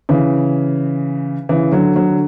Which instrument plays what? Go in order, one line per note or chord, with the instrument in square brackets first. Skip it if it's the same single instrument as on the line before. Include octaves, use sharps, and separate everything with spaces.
[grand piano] C#3 E3
C#3 E3
D3 F#3
D3 F#3
D3